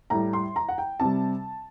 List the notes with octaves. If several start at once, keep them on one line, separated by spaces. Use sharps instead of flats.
A2 G3 A#5
C6
A#5
F#5
G5
C3 G3 A5